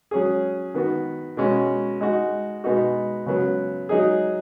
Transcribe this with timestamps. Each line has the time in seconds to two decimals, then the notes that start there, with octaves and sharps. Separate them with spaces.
0.11 F#3 C#4 G#4
0.74 D#3 B3 F#4
1.37 B2 G#3 C#4 F#4
2.01 G#3 D#4 F#4
2.64 B2 G#3 B3 D#4 F#4
3.26 C#3 F#3 B3
3.89 F#3 D#4 G#4